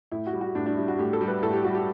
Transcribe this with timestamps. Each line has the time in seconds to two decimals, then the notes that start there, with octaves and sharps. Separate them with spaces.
0.12 A2 E4
0.27 F#4
0.33 G3
0.41 F#4
0.55 A2 D4
0.66 D4
0.77 G3 E4
0.88 F#4
0.99 A2 G4
1.13 A4
1.21 G3
1.28 B4
1.42 A2 A4
1.53 G4
1.64 G3 F#4
1.75 G4